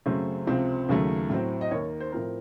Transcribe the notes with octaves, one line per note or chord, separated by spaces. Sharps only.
F#2 C#3 F#3 A3 C4 C5
C#2 C3 F3 C4
D#2 C#3 F#3 A3
A2 F#3 C4
D#5
D#2 D#3 A#3 C#5
C5
A2 F3 C4 A#4